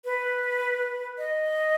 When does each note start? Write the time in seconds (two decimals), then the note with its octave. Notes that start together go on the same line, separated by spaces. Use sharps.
0.05 B4
1.18 D#5